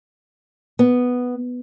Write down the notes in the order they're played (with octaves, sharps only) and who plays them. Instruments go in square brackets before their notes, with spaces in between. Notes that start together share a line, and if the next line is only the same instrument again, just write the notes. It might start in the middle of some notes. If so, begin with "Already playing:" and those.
[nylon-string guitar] B3